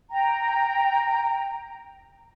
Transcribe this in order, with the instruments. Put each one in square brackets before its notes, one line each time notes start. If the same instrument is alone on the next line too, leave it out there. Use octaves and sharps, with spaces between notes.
[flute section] G5 A#5